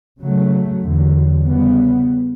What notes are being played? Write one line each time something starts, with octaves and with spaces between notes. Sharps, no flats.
C#3 F#3 A3
E2 D3 F#3
C#3 G3 B3